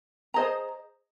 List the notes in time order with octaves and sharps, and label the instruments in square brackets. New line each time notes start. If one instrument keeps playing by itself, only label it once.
[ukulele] G#4 C5 D#5 A#5